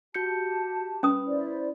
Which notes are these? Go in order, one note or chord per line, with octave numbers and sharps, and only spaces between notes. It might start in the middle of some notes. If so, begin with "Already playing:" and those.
F#4 G4 A5 G6 C#7
C#4 B4 D#6
E4 C5 D5